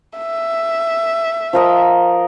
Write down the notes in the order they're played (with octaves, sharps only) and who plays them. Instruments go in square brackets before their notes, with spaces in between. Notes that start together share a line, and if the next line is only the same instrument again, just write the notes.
[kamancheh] E5
[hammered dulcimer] F3 A#4 D#5